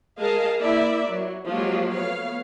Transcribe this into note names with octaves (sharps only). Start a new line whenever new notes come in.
G#3 G#4 A#4 D#5 F5 A5
A#3 E4 A#4 D5 E5
F#3
F3 F#3 G#3 A#3 F4 G4
A3 B3 C#5 F5